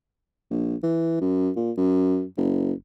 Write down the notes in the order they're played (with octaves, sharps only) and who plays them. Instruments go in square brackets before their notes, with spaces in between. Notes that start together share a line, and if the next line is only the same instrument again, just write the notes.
[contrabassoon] A#1
E3
F#2
A#2
F#2
F#1